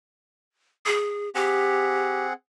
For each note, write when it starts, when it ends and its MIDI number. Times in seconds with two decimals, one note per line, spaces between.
0.86 1.29 68
1.35 2.33 60
1.35 2.26 67
1.35 2.33 68
1.35 2.33 78